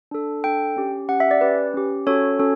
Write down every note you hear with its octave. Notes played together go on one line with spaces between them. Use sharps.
D4 A4
D4 A4 G5
C#4 G4
C#4 G4 F#5
E5
D5
C#4 G4 B4
C#4 G4
C#4 F#4 A4 C#5
C#4 F#4 A4